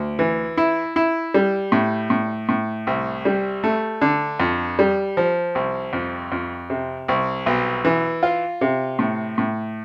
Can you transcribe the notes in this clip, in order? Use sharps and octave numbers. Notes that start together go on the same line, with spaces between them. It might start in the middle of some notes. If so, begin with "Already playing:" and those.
Already playing: D2
E3
E4
E4
G3
A2
A2
A2
C2
G3
A3
D3
F2
G3
F3
C2
F2
F2
C3
C2
B1
E3
F4
C3
A2
A2